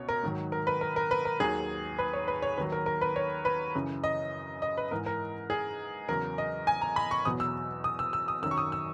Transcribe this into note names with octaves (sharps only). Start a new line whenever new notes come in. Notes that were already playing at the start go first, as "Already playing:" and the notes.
Already playing: C#2 B2 C#5
A#4
G#2 D#3 F#3
A#4
B4
A#4
A#4
B4
A#4
D#2 D#3 F#3 G#4
B4
C#5
B4
C#5
D#2 D#3 F#3 B4
A#4
A#4
B4
C#5
B4
F#2 C#3 E3
D#5
D#5
B4
G#2 E3 A#4
A#4
G#4
E2 C#3 F#3 A#4
D#5
G#5
A#5
B5
C#6
E2 B2 F#3 D#6
E6
D#6
E6
E6
D#6
F#2 D#3 F#3 E6
C#6
D#6
E6